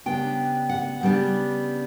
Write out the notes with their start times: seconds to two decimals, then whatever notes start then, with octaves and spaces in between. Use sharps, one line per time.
0.06 C#3 G3 B3 D4 G5
0.69 F#5
1.01 C#3 G3 B3 D4